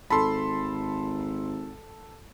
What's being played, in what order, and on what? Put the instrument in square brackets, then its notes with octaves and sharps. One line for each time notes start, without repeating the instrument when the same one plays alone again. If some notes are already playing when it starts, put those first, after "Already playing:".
[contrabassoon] G#1 [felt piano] A4 A5 [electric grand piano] B5 C6